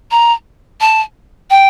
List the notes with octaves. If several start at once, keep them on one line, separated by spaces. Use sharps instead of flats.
A#5
A5
G5